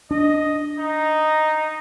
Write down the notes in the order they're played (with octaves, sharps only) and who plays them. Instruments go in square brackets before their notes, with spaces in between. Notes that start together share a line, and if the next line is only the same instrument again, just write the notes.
[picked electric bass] D4 [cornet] D#5
[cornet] D#4